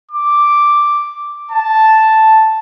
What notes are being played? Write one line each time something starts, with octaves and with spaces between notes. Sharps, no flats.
D6
A5